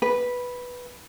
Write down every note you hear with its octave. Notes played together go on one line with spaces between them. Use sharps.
B4